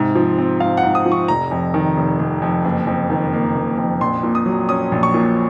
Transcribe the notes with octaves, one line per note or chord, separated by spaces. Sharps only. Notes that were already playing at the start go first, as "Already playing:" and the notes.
Already playing: G#2 C3
F3
C4
G#2 F5
F#5
G#2
D#6
F3
C#6
F1 A#5
F2
D#3
F1
F1
F2
F#1
F2
D#3
A#3
F#1
F2
A#1 C6
A#2
D#6
F#3
C#4 D#6
A#1
C#6
A#2